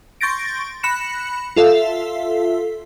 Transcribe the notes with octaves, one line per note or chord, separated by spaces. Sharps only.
C6 C#6 G6 A6 A#6 D7
B5 F#6 A#6 C#7 E7
F4 A4 E5 F5